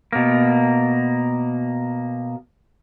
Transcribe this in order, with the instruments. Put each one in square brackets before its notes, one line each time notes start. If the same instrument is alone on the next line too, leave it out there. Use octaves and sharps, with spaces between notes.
[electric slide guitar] B2 A#3